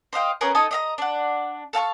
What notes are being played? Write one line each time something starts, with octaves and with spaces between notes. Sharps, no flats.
C5 D#5 F5 G5
B3 C#4 G#4 A#4
D#4 A4 D#5 G#5
D#5 E5 A#5
D4 F#5
A4 F5 A5 C#6